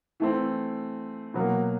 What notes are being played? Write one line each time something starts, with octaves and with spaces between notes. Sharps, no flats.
E3 A3 C4
B2 F#3 A#3